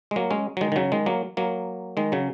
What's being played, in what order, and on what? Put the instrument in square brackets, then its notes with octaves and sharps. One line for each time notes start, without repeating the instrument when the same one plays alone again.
[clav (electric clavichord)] G#3
F#3 A#3
G#3 C#4
F#3
D#3 G#3
D#3
C#3 F#3
D#3 G#3
F#3 A#3
F#3 A#3
D#3 G#3
C#3 F#3